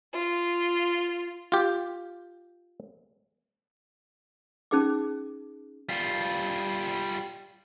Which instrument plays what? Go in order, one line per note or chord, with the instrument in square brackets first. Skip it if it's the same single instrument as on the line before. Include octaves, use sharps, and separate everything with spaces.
[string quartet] F4
[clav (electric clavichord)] F4 G4
[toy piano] C#4 D#4 G#4 G5 D6
[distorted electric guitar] G3 F4